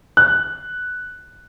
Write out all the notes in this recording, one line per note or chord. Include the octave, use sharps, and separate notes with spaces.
F#6